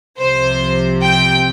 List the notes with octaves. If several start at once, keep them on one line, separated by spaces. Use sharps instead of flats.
C2 C3 F3 C5
G5